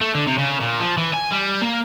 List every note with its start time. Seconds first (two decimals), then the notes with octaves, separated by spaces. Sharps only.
0.01 A3
0.15 D3
0.27 C3
0.39 C#3
0.61 A#2
0.80 F3
0.97 E3
1.14 G#5
1.32 G3
1.62 A#3